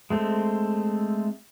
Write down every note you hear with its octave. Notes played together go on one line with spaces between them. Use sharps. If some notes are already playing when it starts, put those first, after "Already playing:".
G#3 A3 C4